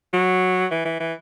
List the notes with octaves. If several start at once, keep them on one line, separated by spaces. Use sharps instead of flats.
F#3
E3
E3
E3